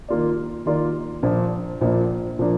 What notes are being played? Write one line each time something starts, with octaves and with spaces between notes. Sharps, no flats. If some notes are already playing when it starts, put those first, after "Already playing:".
D#3 A#3 F4 A#4 D5
D#3 A#3 F4 A#4 D5
A#1 A#2 F3 A#3 D4
A#1 A#2 F3 A#3 D4
A#2 F3 A#3 D4